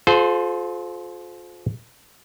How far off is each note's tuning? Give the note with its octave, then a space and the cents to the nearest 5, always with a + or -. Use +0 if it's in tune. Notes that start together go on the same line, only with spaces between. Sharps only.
F4 +25 A4 -40 C5 -15